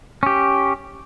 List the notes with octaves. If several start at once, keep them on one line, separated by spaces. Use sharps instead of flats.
C#4 G4